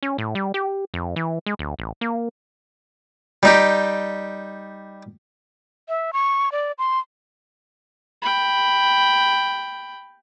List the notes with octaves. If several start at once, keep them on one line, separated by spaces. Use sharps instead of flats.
C#4
A2
G3
G4
F2
E3
G#3
D2
A1
A#3
G3 D#4 G4
E5
C#6
D5
C6
G5 B5